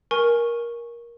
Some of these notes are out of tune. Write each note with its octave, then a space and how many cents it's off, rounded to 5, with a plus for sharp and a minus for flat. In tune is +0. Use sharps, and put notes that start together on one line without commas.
A#4 +15 G#5 +0 C#6 -10